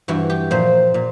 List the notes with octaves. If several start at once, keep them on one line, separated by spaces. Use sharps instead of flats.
G2 E3 F#4
G4
A#2 F3 C5
A#2